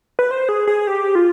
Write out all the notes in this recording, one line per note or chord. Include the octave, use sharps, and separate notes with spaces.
B4
C5
G#4
G#4
G4
F4